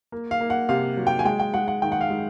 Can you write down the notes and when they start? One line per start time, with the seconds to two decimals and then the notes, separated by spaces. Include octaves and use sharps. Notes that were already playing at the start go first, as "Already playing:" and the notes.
0.12 A#3
0.31 F5
0.41 A#3
0.50 F#5
0.69 C3 F5
0.97 F#3
1.07 G5
1.19 G#5
1.25 G#3 G5
1.40 G5
1.54 G#3 F#5
1.68 F#5
1.82 D#3 G5
1.92 F#5
2.01 F5
2.10 G#3